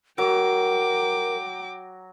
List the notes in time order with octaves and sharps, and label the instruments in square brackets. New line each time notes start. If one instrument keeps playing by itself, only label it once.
[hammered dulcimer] F#3 [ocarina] A#4 [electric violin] G5 D6